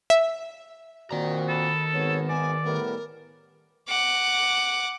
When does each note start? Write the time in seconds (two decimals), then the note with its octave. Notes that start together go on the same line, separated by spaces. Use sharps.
0.10 E5
1.11 A#2 D#3 C4 F#4 D5 A#5
1.49 A4 B5
1.93 G#1 B3 C#5
2.29 D5 G#5
2.64 A2 G3 B3 A#4
3.89 F#5 D6